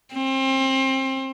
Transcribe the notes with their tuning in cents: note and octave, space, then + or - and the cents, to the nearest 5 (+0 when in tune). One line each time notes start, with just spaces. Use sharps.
C4 +30